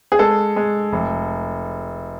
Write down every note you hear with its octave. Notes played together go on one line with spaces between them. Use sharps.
G#4
G#3 A4
G#3
F1